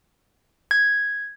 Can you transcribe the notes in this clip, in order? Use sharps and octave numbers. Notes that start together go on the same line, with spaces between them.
G#6